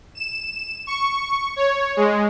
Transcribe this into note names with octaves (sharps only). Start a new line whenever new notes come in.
E7
C#6
C#5
G#3